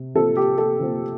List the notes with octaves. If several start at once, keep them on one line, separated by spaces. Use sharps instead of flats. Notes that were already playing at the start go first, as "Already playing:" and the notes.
Already playing: C3
C3 F3 C4 A4
G4
A4
C3 F3 C4